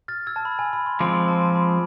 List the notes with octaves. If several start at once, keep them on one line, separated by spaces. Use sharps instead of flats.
F6 A6
E6 G#6
A5
B5
G#5
B5
C6
F3 G#3 C4 D6
C6
A5
A5
C6
B5